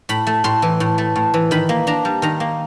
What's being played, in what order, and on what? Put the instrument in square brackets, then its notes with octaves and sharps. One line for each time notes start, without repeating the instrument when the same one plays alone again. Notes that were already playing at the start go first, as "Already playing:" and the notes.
[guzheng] A2 B5
A3
A2 C6
E3
A2
A3
A2
E3
D#3 B5
A#3
D4 A#5
G3
D#3 A#5
A#3